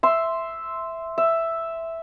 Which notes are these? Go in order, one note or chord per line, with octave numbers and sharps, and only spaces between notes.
E5 C6
E5